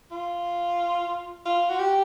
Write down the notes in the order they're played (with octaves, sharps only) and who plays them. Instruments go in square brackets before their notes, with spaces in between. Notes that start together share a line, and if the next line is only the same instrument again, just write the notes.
[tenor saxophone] F4
F4
F#4
G4